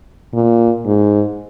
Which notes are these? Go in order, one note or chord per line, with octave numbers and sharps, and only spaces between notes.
A#2
G#2